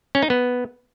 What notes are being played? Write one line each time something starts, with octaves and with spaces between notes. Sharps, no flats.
C#4
D#4
B3